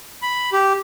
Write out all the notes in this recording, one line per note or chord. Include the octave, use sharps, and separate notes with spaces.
B5
G4